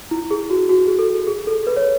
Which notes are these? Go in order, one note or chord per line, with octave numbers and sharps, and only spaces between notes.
E4
G#4
F#4
F#4
G#4
A4
G#4
A4
B4
C#5